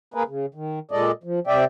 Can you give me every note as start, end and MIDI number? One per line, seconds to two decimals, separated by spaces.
0.14 0.23 58
0.14 0.23 68
0.14 0.23 70
0.14 0.23 71
0.27 0.46 49
0.54 0.79 51
0.91 1.11 46
0.91 1.11 56
0.91 1.11 69
0.91 1.11 74
0.91 1.11 75
1.23 1.40 53
1.47 1.64 48
1.47 1.64 74
1.47 1.64 76
1.47 1.64 79